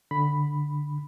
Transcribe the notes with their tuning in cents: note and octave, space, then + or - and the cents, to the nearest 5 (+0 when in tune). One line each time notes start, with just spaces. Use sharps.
D3 +0 B5 +0